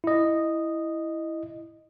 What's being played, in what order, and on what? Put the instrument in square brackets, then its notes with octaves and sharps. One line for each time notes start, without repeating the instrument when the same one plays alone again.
[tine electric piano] E4 D#5